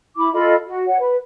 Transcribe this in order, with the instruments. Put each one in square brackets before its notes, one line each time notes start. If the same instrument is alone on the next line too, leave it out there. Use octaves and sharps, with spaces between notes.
[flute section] E4 B5 D6
F4 A4 D#5 B5
F#4
C#5 F#5
B4